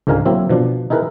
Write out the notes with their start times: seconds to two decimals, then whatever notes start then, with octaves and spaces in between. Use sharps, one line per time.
0.07 C#2 G#2 D3 A#4 F5 G#5
0.25 F#3 A#3 C4 E4
0.49 B2 F3 D4
0.90 D#4 E4 G#4 A#4 B4